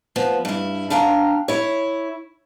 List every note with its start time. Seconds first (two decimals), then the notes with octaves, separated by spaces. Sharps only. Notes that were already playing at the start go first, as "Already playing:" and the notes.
0.16 F3 B3
0.45 G2 E4
0.90 B3 D4 F5 G5 A#5
1.48 E4 C#5